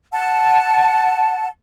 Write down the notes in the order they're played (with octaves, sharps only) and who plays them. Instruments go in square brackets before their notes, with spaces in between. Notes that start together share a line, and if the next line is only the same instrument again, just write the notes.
[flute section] F#5 A5